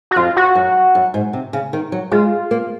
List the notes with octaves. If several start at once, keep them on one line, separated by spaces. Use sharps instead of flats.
F#4
F2 F4
F#4
F#2
F#2
G#2
C3
C#3
D#3
F#3
G#3 F4
A#3